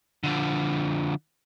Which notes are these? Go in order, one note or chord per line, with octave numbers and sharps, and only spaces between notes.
D3 F3